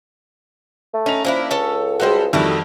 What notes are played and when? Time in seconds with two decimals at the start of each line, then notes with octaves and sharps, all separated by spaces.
0.94 A3
1.06 C#4 D#4 F7
1.25 F3 A#3 D4 E4
1.51 C#2 A4 C#5 A5
2.00 G3 G#3 F#4 A4 C5
2.33 F2 D#3 G3 A3 E4 F#4 A4